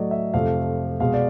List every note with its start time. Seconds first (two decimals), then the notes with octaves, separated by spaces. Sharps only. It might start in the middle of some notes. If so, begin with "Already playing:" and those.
Already playing: A2 F#3 A3 D5 D#5
0.11 E5
0.34 F2 C3 F3 A3 F5
1.00 B2 G#3 F5
1.14 D5